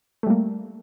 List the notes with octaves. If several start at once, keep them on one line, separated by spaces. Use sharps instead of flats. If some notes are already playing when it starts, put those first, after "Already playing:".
G3 A3 A#3